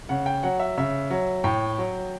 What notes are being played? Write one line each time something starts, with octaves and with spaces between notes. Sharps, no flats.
C#3 F#5
G5
F#3 F#5
E5
C#3 E5
F#3
A2 G5
F#3